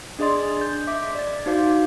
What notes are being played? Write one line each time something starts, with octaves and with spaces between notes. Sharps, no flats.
D4 G#4 D5 D#5 C6 A6
G6
E5 D6 B6
D5 A6
D#4 F#4 C5 F5 D6 G6